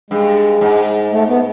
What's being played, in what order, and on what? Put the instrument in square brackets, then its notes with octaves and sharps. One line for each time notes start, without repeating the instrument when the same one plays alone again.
[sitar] G2 [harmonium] G#3
[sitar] G#2
[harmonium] A3
B3